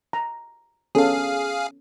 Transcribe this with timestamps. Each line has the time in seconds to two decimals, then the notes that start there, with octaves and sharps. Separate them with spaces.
0.13 A#5
0.95 B3 C#4 G#4 A4 F5